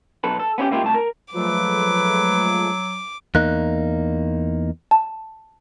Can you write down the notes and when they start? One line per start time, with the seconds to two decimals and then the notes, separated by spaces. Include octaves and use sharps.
0.24 B1 A4 B4
0.39 A4
0.58 B3 C#4 E4 G4
0.71 C#2 A#3 E4 F4 G4
0.83 C2 A2 A5
0.94 A#4
1.34 F3 F#3 G#3 A3 B4 D6
3.35 E2 A#3 D#4 F#6
4.91 A5